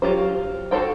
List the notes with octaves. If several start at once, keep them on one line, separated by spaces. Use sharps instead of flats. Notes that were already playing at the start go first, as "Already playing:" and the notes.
F#3 F4 G4 C5
F#4 G#4 A4 C5 G5